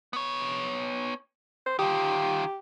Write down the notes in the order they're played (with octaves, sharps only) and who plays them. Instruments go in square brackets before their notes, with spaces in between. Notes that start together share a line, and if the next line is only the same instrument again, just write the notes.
[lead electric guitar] B3 C#5
[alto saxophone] C5
[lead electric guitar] D#3 F4 [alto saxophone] G4